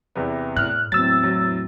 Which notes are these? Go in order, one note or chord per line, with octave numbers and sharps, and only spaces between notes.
E2 C3 B3
A2 F6 F#6
E2 A2 F#3 C4 E6 A6
F#3